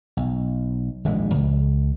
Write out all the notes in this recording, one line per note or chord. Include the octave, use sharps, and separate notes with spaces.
B1
D#1 A#1 A2 G#3
C#2